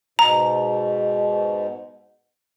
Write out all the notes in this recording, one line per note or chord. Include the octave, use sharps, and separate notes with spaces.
G#2 B2 A#5